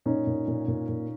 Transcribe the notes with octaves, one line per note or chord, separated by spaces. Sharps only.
A#2 C#4 D#4
A#2
A#2
A#2
A#2